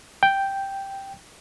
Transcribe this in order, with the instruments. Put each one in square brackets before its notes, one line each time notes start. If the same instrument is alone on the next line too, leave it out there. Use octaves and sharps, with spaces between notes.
[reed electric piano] G5